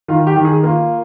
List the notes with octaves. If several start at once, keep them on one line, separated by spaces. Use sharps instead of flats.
D#3 F4
G4
D#3
G#4
A#3 F4